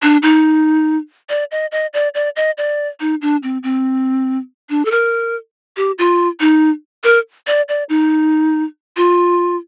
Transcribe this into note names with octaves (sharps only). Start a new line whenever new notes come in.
D4
D#4
D5
D#5
D#5
D5
D5
D#5
D5
D#4
D4
C4
C4
D4
A4
A#4
G4
F4
D#4
A#4
D5
D5
D#4
F4